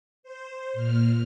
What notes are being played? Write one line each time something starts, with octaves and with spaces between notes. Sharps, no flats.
C5
A#2 F6